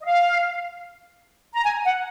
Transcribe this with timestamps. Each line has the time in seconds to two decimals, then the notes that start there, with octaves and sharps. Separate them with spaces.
0.01 D#5
0.05 F5
1.53 A#5
1.64 G#5
1.84 F#5